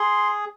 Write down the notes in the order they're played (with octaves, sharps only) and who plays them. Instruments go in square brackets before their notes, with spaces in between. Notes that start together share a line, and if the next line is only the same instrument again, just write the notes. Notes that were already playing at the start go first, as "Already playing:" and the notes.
Already playing: [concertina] G#4 C6